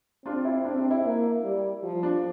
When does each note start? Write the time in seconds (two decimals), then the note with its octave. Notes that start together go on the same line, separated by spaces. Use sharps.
0.25 C4 D4 F4
0.45 E4
0.65 C4 D4
0.78 D4
0.91 E4
1.05 A#3
1.44 G3
1.83 F3
2.03 D4